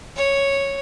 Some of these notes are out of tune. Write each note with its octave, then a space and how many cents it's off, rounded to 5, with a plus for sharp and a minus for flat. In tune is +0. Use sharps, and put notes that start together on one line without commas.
C#5 -5